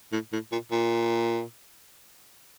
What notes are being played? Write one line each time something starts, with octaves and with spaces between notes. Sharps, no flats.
A2
A2
A#2
A#2